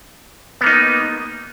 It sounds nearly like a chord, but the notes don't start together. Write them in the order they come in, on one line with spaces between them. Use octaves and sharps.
B3 A#3 D#4